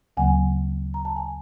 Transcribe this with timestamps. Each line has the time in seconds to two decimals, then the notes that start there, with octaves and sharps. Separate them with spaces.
0.17 D2 C#3 F#3 A#3 F#5 G#5
0.94 A#5
1.05 A5
1.16 G#5